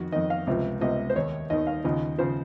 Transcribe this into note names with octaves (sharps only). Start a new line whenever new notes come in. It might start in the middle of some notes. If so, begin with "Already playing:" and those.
Already playing: F2 D#3 F#4
F2 D#3 D#5
F5
C#2 C3 F3
C#2 C3 F3 D#5
C5
D#2 D#3 C#5
D#2 D#3 D#5
F5
D#2 C#3 F3 D#5
C#3 F3 C5